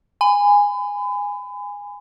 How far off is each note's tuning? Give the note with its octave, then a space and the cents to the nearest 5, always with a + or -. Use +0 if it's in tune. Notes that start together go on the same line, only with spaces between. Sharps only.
G#5 -15 B5 +35